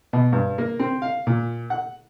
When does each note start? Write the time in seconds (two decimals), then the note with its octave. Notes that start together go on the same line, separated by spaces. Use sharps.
0.13 B2
0.33 G2
0.58 A#3
0.79 C4
1.02 F5
1.27 A#2
1.70 F#5